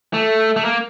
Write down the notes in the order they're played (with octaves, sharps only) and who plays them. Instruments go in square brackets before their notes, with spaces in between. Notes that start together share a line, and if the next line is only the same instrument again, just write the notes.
[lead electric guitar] A3
A3
A#3